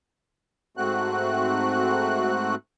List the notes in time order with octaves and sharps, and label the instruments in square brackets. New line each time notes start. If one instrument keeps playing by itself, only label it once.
[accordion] G#2 A3 C4 F#4 F#6